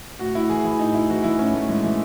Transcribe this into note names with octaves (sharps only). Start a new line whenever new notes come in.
A2 F#4
A2 E4
E3 G#4
E3 E4
A2 D#4
A2 E4
E3 F#4
E3 E4
A2 C#4
A2 A3
E3 G#3
E3 A3